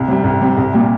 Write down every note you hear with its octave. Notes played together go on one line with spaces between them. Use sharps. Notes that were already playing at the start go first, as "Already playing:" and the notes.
Already playing: C2
C3 G3
C2
C3 G3
C2
A#2 G3